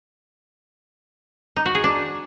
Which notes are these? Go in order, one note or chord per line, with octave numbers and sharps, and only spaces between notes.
D#4
F#4
G#4
D4